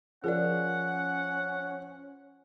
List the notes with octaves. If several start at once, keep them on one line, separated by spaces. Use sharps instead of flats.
F3 C#4 G#4 A#4 D5 F#5